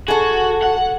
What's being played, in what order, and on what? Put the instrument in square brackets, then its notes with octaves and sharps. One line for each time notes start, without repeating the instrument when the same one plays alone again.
[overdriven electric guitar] F#4 [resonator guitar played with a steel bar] G#4 A4
[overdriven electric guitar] F#5